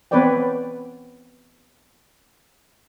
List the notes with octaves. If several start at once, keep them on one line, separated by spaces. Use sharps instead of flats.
B3 C4 B4 C#5 D5 G5